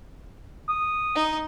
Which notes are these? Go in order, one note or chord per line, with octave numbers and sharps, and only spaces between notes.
D#6
D#4